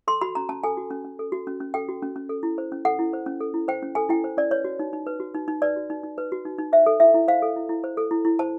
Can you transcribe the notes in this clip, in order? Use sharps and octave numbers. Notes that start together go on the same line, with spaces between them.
A4 C6
F#4 B5
C#4 A#5
C#4 A5
A4 G#5
F#4
C#4
C#4
A4
F#4
C#4
C#4
A4 G5
F#4
C#4
C#4
A4
E4
C5
C#4
A4 F#5
E4
C5
C#4
A4
E4
C5 G5
C#4
A4 G#5
E4 G5
C5
C#4 D5
B4 C#5
F#4
D#4
D#4
B4
F#4
D#4
D#4
B4 D5
F#4
D#4
D#4
B4
F#4
D#4
D#4
C5 E5
A4
E4 E5
E4
C5 F5
A4
E4
E4
C5
A4
E4
E4
C5 A5